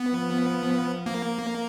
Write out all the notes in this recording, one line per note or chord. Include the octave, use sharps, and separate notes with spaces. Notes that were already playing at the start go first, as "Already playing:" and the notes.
Already playing: B3
F3
A#3